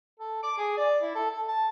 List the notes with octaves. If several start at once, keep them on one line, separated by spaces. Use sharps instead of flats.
A4
D6
G#4
D5
E4
A4
A4
A5